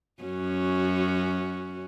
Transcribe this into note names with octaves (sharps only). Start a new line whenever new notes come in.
F#2 C#4 F#4